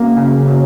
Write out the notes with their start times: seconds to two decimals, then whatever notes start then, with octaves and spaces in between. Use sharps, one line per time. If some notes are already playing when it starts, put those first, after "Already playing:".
Already playing: C#3 F#3 A#3
0.17 C#3
0.48 F#3